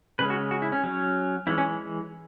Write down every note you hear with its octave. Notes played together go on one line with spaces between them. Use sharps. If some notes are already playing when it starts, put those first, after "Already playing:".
C#3 G#3 C#4 B4
F#4
F#4
E4
C#4
F#3 C#4
E3 G#3 C#4 E4
C#4